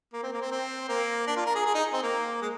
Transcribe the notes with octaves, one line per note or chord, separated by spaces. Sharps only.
A#3
C4
A#3
C4
C4
A#3
D4
F4
A#4
G#4
G#4
D#4
C4
A#3
G#3